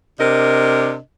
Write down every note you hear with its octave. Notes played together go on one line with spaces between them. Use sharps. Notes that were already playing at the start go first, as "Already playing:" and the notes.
C3 D4 A#4 D#5